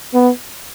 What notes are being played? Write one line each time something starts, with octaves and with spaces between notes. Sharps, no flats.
B3